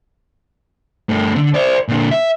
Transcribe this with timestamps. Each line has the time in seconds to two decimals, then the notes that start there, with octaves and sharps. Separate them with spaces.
1.09 G2 A3
1.36 D3 D4
1.54 C5 D5
1.88 A#2 D3
2.11 E5